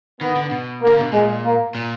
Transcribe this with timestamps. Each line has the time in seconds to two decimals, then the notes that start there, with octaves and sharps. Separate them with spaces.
0.21 D#3 B3
0.35 D3
0.52 B2
0.82 A#3
0.87 D3
1.00 B2
1.12 A#2 G#3
1.44 A#3
1.75 A#2